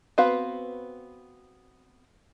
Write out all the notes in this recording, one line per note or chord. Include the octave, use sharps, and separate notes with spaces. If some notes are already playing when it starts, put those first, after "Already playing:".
B3 C4 F#4 B4 F5